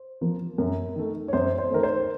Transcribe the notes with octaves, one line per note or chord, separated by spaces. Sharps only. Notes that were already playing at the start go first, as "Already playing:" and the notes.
Already playing: C5
F3 A#3
F#2 A#4
D#3 A3
C#5
F#2 C5
C5
D#3 A3 A#4
C5